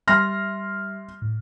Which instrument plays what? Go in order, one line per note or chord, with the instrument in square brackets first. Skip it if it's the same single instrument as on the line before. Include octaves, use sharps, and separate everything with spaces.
[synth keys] G3 E5 [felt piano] C6 F6 A#6
[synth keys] A2